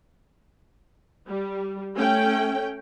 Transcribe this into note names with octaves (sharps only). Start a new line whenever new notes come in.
G3
A3 C#4 G5